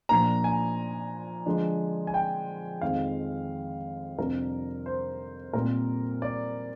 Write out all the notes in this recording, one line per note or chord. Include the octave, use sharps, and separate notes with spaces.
A#2 F3 A#3 D4 A#5
G#5
D3 F3 G#3 D4
G#5
G5
F2 D#3 G#3 F5
F2 C3 G3 D4 A#4
C5
A#2 G3 C4 A#4
D5